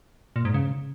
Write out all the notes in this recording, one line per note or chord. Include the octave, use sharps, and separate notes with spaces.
A#2
G#2
C#3